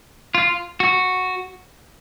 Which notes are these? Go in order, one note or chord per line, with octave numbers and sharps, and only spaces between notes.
F4
F#4